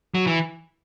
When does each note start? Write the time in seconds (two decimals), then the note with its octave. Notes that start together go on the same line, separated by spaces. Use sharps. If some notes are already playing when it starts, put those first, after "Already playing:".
0.15 F#3
0.27 E3